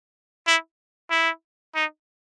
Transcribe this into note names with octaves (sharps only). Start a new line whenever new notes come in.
E4
E4
D#4